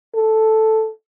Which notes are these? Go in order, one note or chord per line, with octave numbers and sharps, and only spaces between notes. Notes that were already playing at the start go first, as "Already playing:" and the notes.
A4